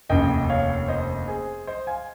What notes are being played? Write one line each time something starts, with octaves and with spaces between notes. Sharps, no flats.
F1 D#2 C#3 D#5 G5
C#5 F5
C5 D#5
G#4 C5
C5 D#5
F5 G#5